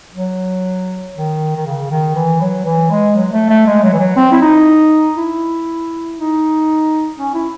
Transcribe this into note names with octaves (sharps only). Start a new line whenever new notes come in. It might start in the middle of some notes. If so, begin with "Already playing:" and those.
F#3
D#3
D#3
C#3
D#3
E3
F#3
E3
G#3
F#3
A3
A3
G#3
F#3
E3
F#3
C4
E4
D#4
E4
D#4
C#4
E4